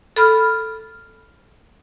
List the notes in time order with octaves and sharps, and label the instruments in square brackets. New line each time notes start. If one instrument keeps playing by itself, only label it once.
[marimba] A4 B5 F6